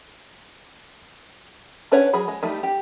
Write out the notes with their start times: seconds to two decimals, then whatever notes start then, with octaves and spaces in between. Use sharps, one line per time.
1.92 C#4 D4 B4 C#5 F#5
2.13 F#3 G#4 B5
2.28 G#3
2.43 G3 A3 D#4
2.63 G4